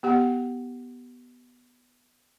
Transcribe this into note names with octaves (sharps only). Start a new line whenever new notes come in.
B3 G4 F#5